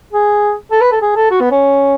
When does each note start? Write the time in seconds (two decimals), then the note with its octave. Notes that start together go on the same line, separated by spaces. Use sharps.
0.13 G#4
0.71 A4
0.81 B4
0.92 A4
1.02 G#4
1.16 A4
1.31 F#4
1.40 B3
1.51 C#4